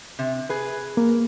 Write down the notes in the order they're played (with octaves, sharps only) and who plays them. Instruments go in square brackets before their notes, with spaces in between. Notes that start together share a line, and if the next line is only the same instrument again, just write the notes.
[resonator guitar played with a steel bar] C3
G#4 B4
[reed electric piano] A#3